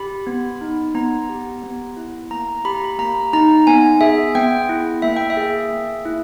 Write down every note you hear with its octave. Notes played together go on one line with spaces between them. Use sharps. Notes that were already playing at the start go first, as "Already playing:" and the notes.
Already playing: G4 B5
B3
D#4
B3 A#5
G4
B3
E4
A#3 A#5
G4 B5
A#5
B5
A#3 A#5
D#4 A#5
B3 G#5
G#4 E5
B3 G5
E4
A#3 E5
G5
E5
G#4
A#3
E4